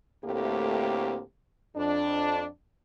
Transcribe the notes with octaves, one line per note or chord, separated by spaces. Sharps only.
D2 A2 A3 A#3 C4 G4
F2 D4